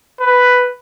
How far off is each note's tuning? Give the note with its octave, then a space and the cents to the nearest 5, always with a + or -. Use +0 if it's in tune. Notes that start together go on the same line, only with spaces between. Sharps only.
B4 +5